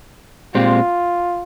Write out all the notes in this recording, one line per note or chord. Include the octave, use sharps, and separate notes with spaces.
A#2 G#3 C4 F4 G4